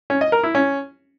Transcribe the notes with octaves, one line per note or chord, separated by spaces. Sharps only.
C#4
D#5
A#4
E4
C#4